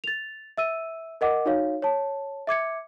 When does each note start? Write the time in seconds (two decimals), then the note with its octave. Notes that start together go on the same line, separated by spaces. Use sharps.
0.04 A6 F7
0.58 E5 E6 D#7
1.21 A#4 D#5 F#5 D6
1.45 D#4 F#4 C#5 F5
1.82 C#5 A5
2.47 E5 D6 G#6 C#7